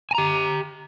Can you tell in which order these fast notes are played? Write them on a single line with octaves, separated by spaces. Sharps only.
G#5 A#5 G4